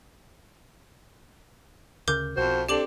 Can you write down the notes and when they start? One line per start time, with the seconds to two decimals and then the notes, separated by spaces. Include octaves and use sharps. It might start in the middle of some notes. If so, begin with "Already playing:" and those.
2.08 D2 C#3 A#4 D6 G6
2.37 B1 F2 F#4 C5
2.69 C4 D4 G4 A4 D6 F#7